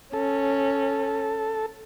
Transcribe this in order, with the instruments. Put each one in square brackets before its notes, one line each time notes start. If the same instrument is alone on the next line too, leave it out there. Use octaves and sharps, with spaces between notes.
[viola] C#4 [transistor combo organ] A4